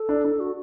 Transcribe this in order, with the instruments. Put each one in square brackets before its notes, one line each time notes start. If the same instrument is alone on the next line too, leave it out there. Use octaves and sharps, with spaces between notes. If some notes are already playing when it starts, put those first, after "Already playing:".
Already playing: [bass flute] A4
[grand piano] D4
D4
[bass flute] F#4